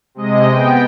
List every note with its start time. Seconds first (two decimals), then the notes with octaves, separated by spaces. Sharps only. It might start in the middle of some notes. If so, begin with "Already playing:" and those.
0.15 C3 G#3 D#5
0.48 B3 G5